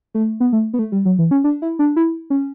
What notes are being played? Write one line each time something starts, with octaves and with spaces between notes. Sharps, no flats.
A3
B3
A3
B3
A3
G3
F#3
E3
C#4
D4
E4
D4
E4
C#4